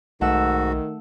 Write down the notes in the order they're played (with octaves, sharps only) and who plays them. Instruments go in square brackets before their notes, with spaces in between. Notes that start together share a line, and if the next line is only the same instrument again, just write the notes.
[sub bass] B1 [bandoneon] G#2 F#4 [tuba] D#3 [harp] A3 F#5 E6